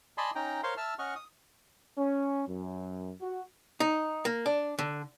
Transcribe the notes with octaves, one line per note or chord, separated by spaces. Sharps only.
D5 D#5 G#5 A5 B5 C6
C#4 D#4 G5 A#5
A#4 C5 C#5 F5 C6
E5 A5 E6 F6
C#4 D#5 F#5 C#6 F6
D#6
C#4
F#2
F#4
D#4
A#3
D4
D3